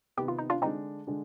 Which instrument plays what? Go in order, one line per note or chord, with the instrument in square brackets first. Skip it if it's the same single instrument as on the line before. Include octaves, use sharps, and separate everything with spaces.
[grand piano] C3 D#3 B3 [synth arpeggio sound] G4
[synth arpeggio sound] F4
D#4
D4 F4
[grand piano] D3 G#3 D4 [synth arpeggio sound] C4 D#4
[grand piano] D3 G#3 D4